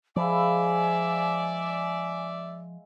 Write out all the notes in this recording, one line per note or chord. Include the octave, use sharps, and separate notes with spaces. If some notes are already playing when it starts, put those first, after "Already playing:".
F3 G#3 E4 D5 E5 F5 G#5